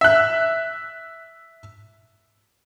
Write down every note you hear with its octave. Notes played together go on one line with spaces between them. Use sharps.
E5 F#6